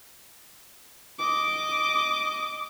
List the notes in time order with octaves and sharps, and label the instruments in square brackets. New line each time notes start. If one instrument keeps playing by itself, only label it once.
[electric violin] D#5 D6